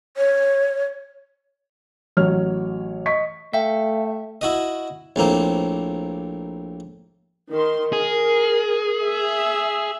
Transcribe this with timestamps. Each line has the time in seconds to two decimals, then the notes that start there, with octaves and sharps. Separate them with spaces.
0.17 C#5
2.17 A1 F#3 C#5 F6
3.06 D#5 C#6 B6
3.53 A3 E5 F5 G5
4.41 E4 F#4 D#5
5.16 A#1 A2 A#3 C4
7.51 D#3 C6
7.93 G#4 A#4
9.03 E5